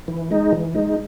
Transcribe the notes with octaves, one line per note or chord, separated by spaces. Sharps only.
E3
G#3 D#4
E3
G#3 D#4